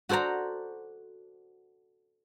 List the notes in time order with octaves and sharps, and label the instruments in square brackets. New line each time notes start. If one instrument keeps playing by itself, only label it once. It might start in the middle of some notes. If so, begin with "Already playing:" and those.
[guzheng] F#4 A4 C5 D5 A#5